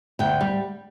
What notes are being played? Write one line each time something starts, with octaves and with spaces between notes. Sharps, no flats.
D2 G5
G3